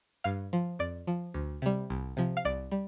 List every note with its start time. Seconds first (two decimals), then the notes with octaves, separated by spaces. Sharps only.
0.24 G2 F5
0.53 F3
0.79 F2 D5
1.07 F3
1.34 D2
1.62 C3 G3
1.90 C2
2.17 C3 F3
2.37 F5
2.45 C2 D5
2.71 G3